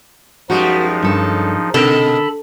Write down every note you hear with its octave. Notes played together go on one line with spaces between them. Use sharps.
F#2 F3 G3 G#3 D#4 F#4
G2 A4 C#5
B2 D3 D#4 A4 A#4 B5